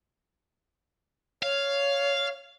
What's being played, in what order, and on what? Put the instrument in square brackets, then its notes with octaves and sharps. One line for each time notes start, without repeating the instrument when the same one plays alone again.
[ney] C#5 [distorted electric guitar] F5